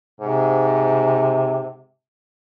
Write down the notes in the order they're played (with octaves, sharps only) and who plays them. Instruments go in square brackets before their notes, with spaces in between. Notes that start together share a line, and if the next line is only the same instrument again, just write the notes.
[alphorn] G#2 [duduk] C3